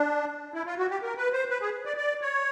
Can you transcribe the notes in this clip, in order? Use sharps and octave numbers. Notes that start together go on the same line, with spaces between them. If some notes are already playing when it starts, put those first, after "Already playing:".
Already playing: D4
E4
F4
F#4
G4
A#4
B4
C5
B4
G#4
D5
D5
C#5